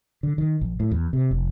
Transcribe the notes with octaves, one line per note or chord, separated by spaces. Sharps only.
D3
D#3
A#1
A2
E2
C3
F1